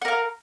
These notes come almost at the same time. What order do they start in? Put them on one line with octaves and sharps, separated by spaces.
F#5 A#4 F5